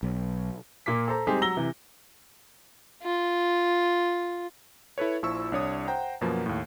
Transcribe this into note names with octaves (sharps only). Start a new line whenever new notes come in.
B1
A#2 A#3 D6 B6
A4 C5 A#5
G3 G#3 C4 D#4 G4 G#4
F#3 A#5 E6 A#6 G7
C3 E3
F4
E4 A4 B4 C#5
A#1 F3 E4 C#6 E6
C2 D4 C#5 D#6
C5 F#5 G5 A#5
F#2 B2 F3 A#3 B3
D#2 A2